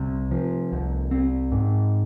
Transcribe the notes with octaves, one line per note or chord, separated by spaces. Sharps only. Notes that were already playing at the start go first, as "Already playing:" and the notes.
Already playing: C2 C3
F3
C2
C4
G#2